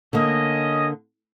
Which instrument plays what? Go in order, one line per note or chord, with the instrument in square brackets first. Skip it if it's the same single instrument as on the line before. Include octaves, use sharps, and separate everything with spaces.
[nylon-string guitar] D3 A#3 [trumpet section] C#4 D#5